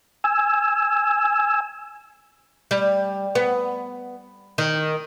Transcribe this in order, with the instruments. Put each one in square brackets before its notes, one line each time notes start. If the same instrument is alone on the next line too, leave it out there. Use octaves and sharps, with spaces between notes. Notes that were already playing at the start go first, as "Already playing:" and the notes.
[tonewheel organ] G#5 E6
[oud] G3
B3
D#3